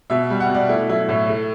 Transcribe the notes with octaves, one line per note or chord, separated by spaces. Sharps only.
B2 E5
G3
F#5
B2
D5
A3 E4
F#3 E4
A2 E4
A3